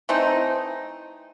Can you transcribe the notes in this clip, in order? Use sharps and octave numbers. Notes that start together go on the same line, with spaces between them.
E3 A3 C4 D#4